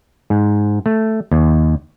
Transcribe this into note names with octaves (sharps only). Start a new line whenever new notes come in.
G#2
A3
D#2